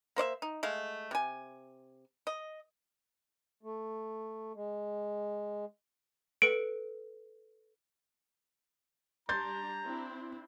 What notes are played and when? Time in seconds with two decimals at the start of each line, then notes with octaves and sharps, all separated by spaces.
0.16 A#3 C5 D5 E5
0.42 D#4
0.63 G#3 A3 F5
1.11 C3 G#5
2.27 D#5
3.63 A3
4.55 G#3
6.42 A4 B4 C#7 D7
9.29 G3 D4 A#5 C6 G6 A6
9.83 C4 D4 E4